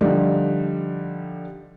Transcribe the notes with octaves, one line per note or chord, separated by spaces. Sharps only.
D3 F3 G3 D#4